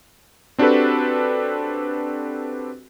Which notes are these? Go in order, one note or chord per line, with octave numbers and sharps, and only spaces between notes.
C4 D4 F#4 G4 A4 B4